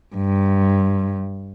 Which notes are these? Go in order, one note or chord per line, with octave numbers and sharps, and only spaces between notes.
G2